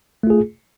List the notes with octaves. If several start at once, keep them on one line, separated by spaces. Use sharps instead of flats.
A3 F4 G#4